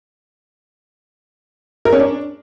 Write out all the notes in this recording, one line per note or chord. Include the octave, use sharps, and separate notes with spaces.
A#4
C#4
D4